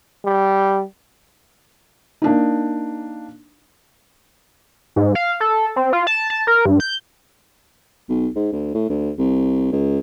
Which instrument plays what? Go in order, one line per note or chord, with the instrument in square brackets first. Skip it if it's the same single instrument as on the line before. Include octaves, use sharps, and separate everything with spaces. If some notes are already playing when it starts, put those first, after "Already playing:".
[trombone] G3
[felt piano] A#3 D4 D#4
[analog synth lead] G#2
F5
A4
C4
F4
A5
A5
A#4
G2
G6
[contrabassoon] B1
G#2
D2
A2
D2
C2
C#2